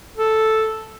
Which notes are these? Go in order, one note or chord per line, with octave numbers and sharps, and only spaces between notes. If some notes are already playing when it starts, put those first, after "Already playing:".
A4